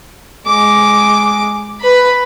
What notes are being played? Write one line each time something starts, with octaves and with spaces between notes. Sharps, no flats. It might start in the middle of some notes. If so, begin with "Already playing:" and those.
G#3 D6
B4 B5